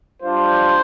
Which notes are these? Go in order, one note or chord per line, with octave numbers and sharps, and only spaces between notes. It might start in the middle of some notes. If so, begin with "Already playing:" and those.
G3 D4 F4 C5